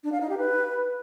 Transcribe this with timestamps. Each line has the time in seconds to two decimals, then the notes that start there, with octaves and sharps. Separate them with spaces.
0.04 D4
0.12 F5
0.21 D#4
0.29 G4
0.38 B4